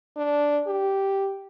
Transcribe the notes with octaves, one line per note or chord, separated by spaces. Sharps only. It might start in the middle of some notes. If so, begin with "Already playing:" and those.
D4
G4